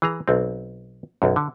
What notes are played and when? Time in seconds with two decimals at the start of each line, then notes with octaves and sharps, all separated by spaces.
0.02 E3 G#4 A#5
0.28 B1 C4
1.22 B1 F#2
1.36 D3